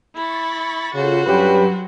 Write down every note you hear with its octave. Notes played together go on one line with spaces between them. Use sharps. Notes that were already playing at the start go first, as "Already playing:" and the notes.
E4 B5 C#6 A6
C#3 F4 F#4 A4 C5
G2 F#3 C#4 G4 B4